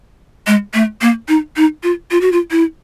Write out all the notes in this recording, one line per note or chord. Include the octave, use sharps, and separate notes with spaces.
G#3
A3
A#3
D#4
D#4
F4
F4
F#4
F4
E4